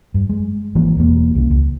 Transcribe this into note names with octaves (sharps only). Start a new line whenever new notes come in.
G2
G#3
G#1 E3 G#3 A#3
E1 E2 A#3
C2 C#3
C#2